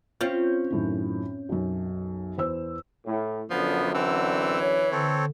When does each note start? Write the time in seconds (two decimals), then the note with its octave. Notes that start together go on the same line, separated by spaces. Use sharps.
0.21 C4 C#4 F4 G6
0.70 F#2 A2 D#3
1.49 B1 F#2
2.38 E2 C5 E6
3.06 A2
3.50 F#2 D3 F3 B3
3.94 E3 C4 E6
4.60 C#5
4.92 D3 C4 A4 C#5